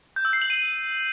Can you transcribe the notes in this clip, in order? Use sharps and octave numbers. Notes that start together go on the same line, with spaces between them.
G6
E6
C7
F#7
D#7